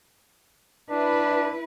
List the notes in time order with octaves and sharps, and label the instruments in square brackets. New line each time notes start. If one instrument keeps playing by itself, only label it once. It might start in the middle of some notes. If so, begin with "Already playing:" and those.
[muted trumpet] D4 [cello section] E4 B4